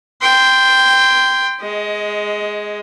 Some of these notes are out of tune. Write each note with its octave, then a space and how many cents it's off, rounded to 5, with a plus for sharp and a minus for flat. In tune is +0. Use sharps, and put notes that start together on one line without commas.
G5 +10 C6 -20
G#3 +0 D#5 +20